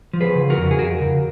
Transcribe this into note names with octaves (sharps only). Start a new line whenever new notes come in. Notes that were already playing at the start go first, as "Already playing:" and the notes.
F3
G#4 B4
C#3
F#4 A#4
F2
G#4
F2 F#4 A#4
C#3